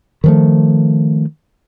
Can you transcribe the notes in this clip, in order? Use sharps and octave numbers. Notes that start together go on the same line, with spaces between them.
D#3 F3 A3